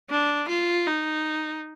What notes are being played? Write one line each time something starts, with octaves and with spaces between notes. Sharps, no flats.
D4
F4
D#4